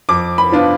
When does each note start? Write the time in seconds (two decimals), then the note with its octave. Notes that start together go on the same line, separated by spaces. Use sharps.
0.09 F2 D6
0.38 B5
0.52 F3 B3 D4 F4